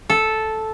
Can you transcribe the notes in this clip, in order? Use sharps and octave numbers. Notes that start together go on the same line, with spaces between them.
A4